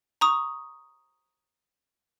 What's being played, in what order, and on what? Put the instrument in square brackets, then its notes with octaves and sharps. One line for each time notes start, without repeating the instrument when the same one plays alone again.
[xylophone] A#5 C#6 D#6